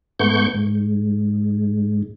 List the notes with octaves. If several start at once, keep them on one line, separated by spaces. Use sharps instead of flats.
G#2 A3 B3 C#6 G6
G#2